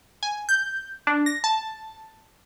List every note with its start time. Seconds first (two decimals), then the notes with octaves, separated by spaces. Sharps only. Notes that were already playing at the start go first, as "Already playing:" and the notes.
0.23 G#5
0.49 G6
1.07 D4
1.26 A#6
1.44 A5